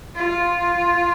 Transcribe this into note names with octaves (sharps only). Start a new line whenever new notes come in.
F4